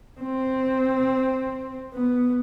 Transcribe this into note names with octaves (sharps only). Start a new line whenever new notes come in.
C4
B3